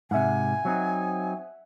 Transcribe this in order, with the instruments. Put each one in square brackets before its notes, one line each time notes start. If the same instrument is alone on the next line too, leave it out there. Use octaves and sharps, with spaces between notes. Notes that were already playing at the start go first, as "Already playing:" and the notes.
[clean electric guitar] G#2 C3 [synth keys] E5 F#5 [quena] G#5
[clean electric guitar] F#3 C4 D#4